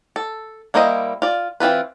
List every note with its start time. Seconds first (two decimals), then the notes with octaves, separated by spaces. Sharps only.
0.16 A4
0.74 G3 A#3 E4 C5 D#5
1.22 F4 D5
1.60 E3 C4 F4 B4